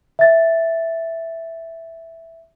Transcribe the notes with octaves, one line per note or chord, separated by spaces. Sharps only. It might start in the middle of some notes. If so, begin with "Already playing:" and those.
E5 A6